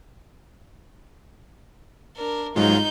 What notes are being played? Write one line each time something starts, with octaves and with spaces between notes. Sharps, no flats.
D4 A#4
G#2 F#3 G#3 D#4 F4 G6